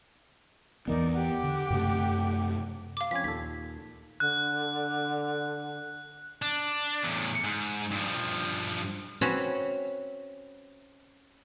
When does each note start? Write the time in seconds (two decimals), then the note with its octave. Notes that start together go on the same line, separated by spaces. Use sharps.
0.88 E2 E3 B3 D#4 A#4 D5
1.14 G4 F#5 D6
1.43 D3
1.70 F#2 C3 A3
2.97 F5 D6
3.11 F3 C4 C#4 G#6 B6
3.24 D#2 A#2 A4 B6
4.20 D3 F#6
6.42 D4
7.03 E2 A2
7.44 G#2
7.91 G2 F3
9.21 C4 C#4 F#4 B4 C#5